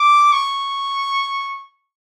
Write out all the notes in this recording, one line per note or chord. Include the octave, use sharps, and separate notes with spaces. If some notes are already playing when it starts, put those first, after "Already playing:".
Already playing: D6
C#6